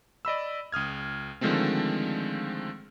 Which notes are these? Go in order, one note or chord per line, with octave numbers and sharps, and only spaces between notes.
D5 D#5 B5 E6
C#2 D#6 F6 G#6
D3 D#3 F3 G#3 A3 C4